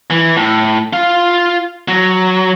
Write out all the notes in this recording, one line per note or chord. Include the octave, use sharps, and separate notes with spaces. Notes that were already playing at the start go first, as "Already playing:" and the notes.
E3
A2
F4 F5
F#3